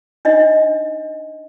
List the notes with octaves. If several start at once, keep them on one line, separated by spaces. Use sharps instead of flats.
D4 D#4 D#5